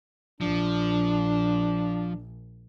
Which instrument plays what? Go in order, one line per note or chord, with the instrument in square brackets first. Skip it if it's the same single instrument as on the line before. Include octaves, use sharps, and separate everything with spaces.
[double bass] A#1 [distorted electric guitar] F3 [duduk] D4